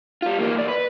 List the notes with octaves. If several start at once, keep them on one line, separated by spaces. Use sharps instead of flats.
G3 F4
E2 A#3
C2 D5
B4